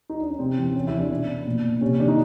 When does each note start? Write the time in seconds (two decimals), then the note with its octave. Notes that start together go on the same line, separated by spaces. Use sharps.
0.09 D#4
0.20 D4
0.30 C#4
0.39 C3 C4
0.58 E3 C4
0.75 C3 C#4
0.87 E3 E4
0.99 D4
1.10 B2 D4
1.28 B2
1.47 A#2
1.64 A#2
1.81 C3 C#4
1.99 D#3 D4
2.08 D#4